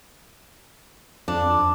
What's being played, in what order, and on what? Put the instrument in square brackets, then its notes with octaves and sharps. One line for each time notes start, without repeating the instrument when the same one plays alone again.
[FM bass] F2 [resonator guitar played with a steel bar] D4